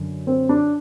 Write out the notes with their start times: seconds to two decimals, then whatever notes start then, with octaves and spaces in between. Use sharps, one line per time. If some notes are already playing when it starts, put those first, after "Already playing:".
Already playing: F#2 D3
0.27 C4
0.49 D4